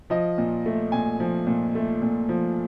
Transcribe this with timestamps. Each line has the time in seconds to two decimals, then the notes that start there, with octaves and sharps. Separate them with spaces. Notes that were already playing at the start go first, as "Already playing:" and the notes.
0.10 F3 D#5
0.38 A#2
0.66 A3
0.92 A#2 G#5
1.20 F3
1.47 A#2
1.75 A3
2.02 A#2
2.29 F3